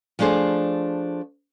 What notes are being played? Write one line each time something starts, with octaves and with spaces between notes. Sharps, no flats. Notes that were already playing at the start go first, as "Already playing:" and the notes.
F3 A3 D4 G#4 C5 D5